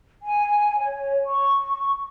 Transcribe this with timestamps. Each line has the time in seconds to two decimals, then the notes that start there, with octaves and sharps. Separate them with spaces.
0.22 G#5
0.80 C#5
1.26 C#6